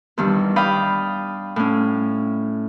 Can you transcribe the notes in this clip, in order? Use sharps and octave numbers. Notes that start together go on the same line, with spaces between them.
E2 G2 D#3
D5 F5 G5 B5 D#6
A2 C#4